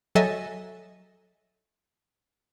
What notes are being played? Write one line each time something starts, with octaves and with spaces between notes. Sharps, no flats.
F#3 A4 D#5 E5 G#5 A6